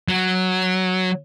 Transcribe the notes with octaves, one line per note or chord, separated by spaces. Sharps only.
F#3